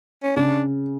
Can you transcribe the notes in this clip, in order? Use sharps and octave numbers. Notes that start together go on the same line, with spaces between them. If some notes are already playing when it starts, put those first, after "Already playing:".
C#4
C#3 D4